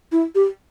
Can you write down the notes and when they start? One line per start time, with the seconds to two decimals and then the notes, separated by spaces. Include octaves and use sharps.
0.12 E4
0.35 G4